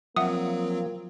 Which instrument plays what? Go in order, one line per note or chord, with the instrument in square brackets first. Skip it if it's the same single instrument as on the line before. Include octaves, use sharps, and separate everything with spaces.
[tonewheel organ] F3 [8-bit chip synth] F#3 C4 [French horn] A#3 [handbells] E5 F#5 D#6